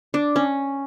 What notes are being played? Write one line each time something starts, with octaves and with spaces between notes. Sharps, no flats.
D4
C#4